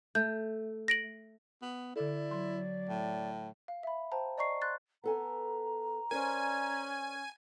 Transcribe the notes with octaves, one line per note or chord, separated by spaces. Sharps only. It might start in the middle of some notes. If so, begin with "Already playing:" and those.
A3 G6
A#6 D7 F#7
B3
D3 E4 A4 D5
F#3 C6
A2
F5
E5 B5
C5 G5 A5 A#5
D5 D#5 A#5 C#6 C7
C6 F#6 A6
B3 A4 G#5 A#5
C#4 A#4 C5 D5 G#5